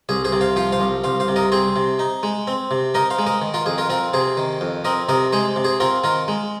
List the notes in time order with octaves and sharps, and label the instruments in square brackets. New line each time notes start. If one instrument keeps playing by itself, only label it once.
[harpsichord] C2 G#4
G#4 C5
C3
C5 F5
F3 C5 F5
C5 F5
C2
C2 C5 F5
C5 F5
C3
A#4 D#5
C4 G#4 C5
C3
D#4
G#3
C4
C3
D#4 A#4 D#5
C5 F5
G#3
A#4 D#5
D#3
F4 A#4
F2 G#4
F4 A#4
C4 F4 A#4
C3 G#4 C5
D#3
F2
C4 A#4 D#5
C3 A#4 D#5
G#3 G#4 C5
C3
G#4 C5
C4 F4 A#4
D#3 F4 A#4
G#3